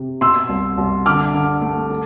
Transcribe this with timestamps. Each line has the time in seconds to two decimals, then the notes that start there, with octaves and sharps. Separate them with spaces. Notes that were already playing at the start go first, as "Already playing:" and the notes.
Already playing: C3
0.21 B2 C6 E6
0.49 C2
0.78 C2
1.06 D3 D6 F6
1.34 D3
1.62 A3
1.90 A3